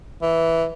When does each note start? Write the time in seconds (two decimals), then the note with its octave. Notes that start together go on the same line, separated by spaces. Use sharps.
0.22 E3